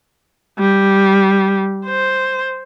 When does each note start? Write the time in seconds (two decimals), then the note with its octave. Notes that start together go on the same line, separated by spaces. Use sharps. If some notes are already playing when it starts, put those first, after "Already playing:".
0.59 G3
1.86 C5